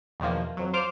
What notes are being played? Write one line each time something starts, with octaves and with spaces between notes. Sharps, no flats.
E2 B2 D#3 F3 A#3
F2 F#3
F4 C5 D6 F6